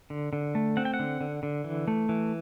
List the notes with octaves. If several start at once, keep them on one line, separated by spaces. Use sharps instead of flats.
D3
D3
A3
C4 F#5
G5
F#5
D3
D3
D3
E3
A3
E3